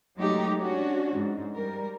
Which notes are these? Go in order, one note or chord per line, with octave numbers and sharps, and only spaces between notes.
F#3 G#3 A3 D#4 G4
C#4 D4 F#4
G#2
G3 A#4